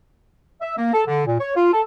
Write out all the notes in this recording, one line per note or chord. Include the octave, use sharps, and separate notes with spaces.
E5
A#3
A4
D3
A#2
C#5
F4
A4